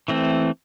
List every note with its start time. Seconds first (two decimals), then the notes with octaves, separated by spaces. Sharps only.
0.08 E3 A3 C4